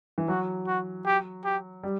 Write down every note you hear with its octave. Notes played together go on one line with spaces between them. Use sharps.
E3
F#3 F#4
F#4
G4
G4
G3